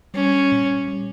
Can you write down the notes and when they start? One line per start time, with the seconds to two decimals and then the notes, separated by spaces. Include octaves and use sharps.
0.14 G3 C#4
0.52 A#2
0.88 G3